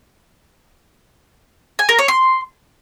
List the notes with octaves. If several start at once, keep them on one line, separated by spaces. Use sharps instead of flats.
G#5
A#4
C#5
C6